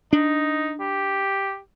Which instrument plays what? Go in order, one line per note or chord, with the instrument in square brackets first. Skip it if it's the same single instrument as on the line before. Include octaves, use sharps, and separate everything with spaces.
[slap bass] D4 [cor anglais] D#4
[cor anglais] G4